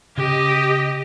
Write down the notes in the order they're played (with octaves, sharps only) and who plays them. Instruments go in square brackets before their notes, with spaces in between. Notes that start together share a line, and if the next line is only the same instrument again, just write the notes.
[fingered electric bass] C#3 [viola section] G4 D#5